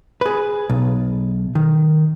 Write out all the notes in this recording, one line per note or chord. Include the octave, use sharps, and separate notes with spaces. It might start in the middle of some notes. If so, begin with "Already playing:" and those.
G#4 B4
B1
D#3